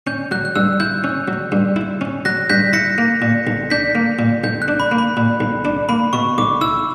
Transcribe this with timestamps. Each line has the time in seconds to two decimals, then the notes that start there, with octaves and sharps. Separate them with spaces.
0.07 C#4 G6
0.31 F#3 F#6
0.45 F#6
0.55 G2 E6
0.80 E4 G6
1.04 C#4
1.28 F#3
1.52 G2
1.76 E4
2.01 C#4
2.25 F#3 F#6 A#6
2.49 G2 G6 B6
2.73 E4 A#6 C#7
2.98 A#3
3.22 A#2
3.47 B1
3.70 D4 G6 B6
3.95 A#3
4.19 A#2
4.44 B1 G6
4.62 F#6
4.68 D4
4.80 B5
4.92 A#3
4.98 B5
5.17 A#2
5.40 B1
5.65 D4
5.89 A#3 B5
6.13 B2 C#6
6.38 B1 D6
6.61 E4 E6